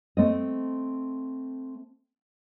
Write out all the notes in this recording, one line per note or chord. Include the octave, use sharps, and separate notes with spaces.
A3 C4 D#5